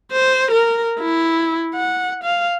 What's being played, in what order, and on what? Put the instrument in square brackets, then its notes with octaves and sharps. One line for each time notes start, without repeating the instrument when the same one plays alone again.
[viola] C5
A#4
E4
F#5
F5